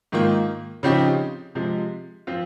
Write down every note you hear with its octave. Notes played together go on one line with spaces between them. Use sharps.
G#2 D#3 A#3 F4
C#3 F3 C4 D#4 G4
C3 F3 G#3
F3 C4 F4